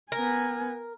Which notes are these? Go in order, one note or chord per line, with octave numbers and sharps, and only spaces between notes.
B3 A#4 G#5